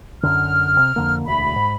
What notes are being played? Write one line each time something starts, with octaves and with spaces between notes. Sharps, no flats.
F#2 D3 F6
C3
F2 D3 A#3
E1 D2 B5
G#2